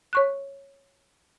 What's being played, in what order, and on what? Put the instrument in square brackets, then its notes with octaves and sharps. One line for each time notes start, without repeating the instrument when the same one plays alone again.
[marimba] C#5 C#6 F#6